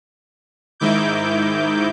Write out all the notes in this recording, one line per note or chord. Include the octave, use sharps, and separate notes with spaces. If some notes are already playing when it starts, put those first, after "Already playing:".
G#2 D#3 E4 D6 G6